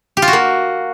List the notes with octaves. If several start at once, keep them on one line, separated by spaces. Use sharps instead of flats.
G4
F4
F#4
A#3